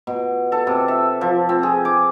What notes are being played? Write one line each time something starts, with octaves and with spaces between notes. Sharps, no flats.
B2
A4
C3
E5
F3
C4
G#4
D6